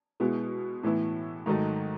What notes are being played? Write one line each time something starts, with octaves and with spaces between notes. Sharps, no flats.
B2 G#3 B3 E4
A2 E3 B3 E4
G#2 D#3 F#3 A3 D#4